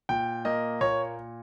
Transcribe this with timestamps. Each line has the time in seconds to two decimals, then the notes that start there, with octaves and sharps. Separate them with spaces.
0.09 A#2 G5
0.45 A#3 D#5
0.81 A#2 C#5